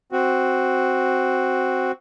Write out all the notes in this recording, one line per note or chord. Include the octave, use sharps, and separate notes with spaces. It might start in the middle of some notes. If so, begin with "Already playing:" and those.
C4 F#4